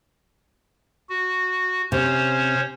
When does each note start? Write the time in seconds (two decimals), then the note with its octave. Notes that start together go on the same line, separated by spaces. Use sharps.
1.09 F#4
1.92 C3 C#4 C5 C#5